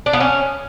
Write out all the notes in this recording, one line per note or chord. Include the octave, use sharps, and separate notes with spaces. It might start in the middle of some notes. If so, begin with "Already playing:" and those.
D4
B3
C#4